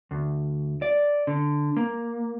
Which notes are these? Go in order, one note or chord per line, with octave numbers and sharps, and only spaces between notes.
D2
D5
D3
A#3